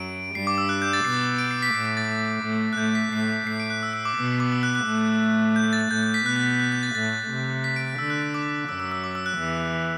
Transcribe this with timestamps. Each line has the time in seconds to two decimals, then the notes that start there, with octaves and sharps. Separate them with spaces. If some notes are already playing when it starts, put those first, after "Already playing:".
Already playing: F#2 F#3 D7
0.34 G2 G3 C7
0.47 D6
0.58 E6
0.69 F#6
0.82 G6
0.93 A6
1.04 B2 B3 C7
1.38 D7
1.51 C7
1.62 B6
1.74 A2 A3 C7
1.86 B6
1.97 A6
2.43 A2 A3
2.73 F#6
2.77 A2 A3 G6
2.95 B6
3.12 A2 A3 C7
3.47 A2 A3 C7
3.60 D7
3.70 F#6
3.83 E6
3.93 E6
4.05 D6
4.16 B2 B3 E6
4.40 D6
4.52 E6
4.63 F#6
4.75 F#6
4.86 A2 A3
5.56 G6
5.73 A6
5.90 A2 A3 G6
6.03 G6
6.14 B6
6.26 B2 B3 F#6
6.36 F#6
6.60 F#6
6.72 G6
6.83 A6
6.95 A2 A3 A6
7.30 C3
7.64 B6
7.76 D7
7.98 D3 E6
8.10 F#6
8.22 E6
8.34 D6
8.69 F#2 F#3 E6
8.80 E6
8.92 E6
9.04 D6
9.15 E6
9.26 F#6
9.38 E2 E3